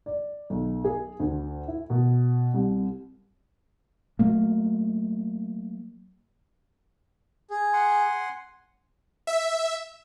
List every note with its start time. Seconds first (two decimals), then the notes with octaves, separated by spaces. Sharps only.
0.06 D5
0.50 B1
0.84 G#4
1.20 D2
1.68 E4
1.90 B2
2.54 C2
4.19 F#3 A3 A#3
7.50 G#4
7.73 F#5 G#5 C6
9.27 E5